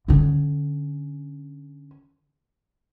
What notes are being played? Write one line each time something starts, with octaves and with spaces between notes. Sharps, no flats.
D3 C#4